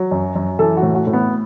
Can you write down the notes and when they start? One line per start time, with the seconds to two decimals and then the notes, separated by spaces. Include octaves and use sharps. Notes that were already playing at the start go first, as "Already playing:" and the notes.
Already playing: F#3
0.11 F#2
0.35 F#2
0.59 E3 A4
0.77 F#4
0.83 A2
0.95 F#4
1.07 A2
1.13 B3